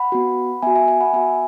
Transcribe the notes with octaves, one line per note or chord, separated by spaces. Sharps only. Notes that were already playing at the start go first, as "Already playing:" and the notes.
Already playing: F#5 B5
B3 F#4
B3 F#4 E5 G#5
E5 G#5
E5 G#5
F#5 B5
B3 F#4 E5 G#5